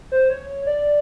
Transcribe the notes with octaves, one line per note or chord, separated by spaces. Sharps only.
C5
C#5
D5